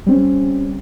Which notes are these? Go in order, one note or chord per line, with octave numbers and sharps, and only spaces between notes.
G3 C4 C#4